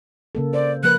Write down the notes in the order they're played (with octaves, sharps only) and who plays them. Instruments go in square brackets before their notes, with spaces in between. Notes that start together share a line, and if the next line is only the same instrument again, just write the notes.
[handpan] C#3 A#3 A4
[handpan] C5 [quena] D5
[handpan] F3 A#3 B4 [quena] F#6